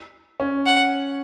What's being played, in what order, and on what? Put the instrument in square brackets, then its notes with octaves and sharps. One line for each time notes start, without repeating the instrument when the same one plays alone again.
[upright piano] C#4
[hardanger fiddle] F#5